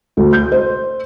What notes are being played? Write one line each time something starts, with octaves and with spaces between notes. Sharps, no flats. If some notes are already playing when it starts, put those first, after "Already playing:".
D2
G6
C5